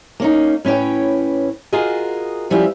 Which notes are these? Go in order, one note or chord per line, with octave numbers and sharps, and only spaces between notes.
A#3 C#4 D#4
A2 C#4 B4 C#5 G5
F4 F#4 G#4 A#4 D#5
F3 G3 C#4 E4 F4